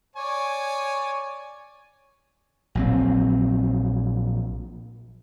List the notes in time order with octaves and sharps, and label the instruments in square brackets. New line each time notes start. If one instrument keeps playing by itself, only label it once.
[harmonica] C#5 D5 G#5
[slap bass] A#1 F#3 C4